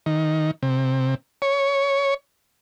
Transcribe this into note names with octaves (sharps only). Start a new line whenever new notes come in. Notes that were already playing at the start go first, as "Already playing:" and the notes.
D#3
C3
C#5